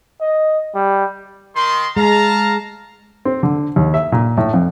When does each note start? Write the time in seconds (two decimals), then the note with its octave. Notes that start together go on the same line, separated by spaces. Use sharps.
0.21 D#5
0.75 G3
1.56 D#3 C6
1.97 G#3 F5 A5 A#5
3.25 C4
3.43 D3
3.76 D#2
3.94 E5
4.12 A#2
4.37 A2
4.53 F2